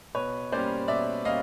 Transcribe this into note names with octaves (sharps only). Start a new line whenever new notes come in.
B2 B4 C#5
G3 A#3 C#4 C5 D5
B2 D5 E5
G3 A#3 C#4 D#5 F5